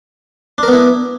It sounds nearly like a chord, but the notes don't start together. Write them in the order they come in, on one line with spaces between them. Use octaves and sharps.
D4 A#4 B3 E4